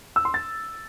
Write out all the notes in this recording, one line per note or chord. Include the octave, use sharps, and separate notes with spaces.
E6
C6
A6